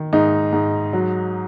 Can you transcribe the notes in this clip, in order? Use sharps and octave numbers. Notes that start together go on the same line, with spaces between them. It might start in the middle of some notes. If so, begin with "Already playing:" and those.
Already playing: D#3
G#2 D#4
G#2
F#3